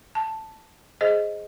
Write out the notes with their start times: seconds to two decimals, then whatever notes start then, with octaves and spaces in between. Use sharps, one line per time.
0.15 A5
1.01 G#4 C5 D#5